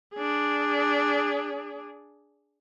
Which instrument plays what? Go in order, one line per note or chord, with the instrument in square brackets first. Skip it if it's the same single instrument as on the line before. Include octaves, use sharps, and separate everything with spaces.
[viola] D4 G#4